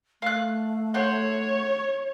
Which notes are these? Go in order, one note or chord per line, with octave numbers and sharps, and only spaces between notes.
A3 F5 F#6
C5 C#5 F#5